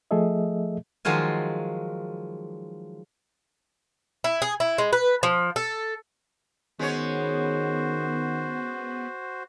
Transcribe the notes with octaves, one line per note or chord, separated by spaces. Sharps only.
F3 A3 G#4 A4 D#5 E5
D#3 F3 F#3 G#3 F4 G#5
E4
G#4
E4
G#3
B4
F3
A4
D#3 G#3 B3 C#4 F#4 C5 C#5